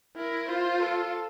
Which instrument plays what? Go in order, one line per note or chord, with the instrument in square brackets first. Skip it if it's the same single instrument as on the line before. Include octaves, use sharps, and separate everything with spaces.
[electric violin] E4 [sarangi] A#4
[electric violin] F4 [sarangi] C5
[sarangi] A4